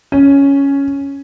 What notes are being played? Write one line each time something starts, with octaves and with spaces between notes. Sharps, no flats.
C#4